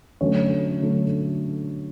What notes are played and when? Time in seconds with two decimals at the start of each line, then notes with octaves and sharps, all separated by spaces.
0.21 D3 F#3 A3 C#4 C#5
0.82 D3 F#3 A3